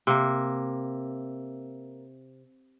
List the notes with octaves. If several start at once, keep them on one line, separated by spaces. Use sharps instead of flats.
C3 A#3